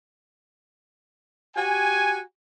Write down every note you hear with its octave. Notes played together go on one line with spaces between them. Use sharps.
F#4 G4 G#5